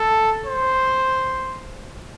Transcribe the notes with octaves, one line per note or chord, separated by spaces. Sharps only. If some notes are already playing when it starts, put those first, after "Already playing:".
Already playing: A4
C5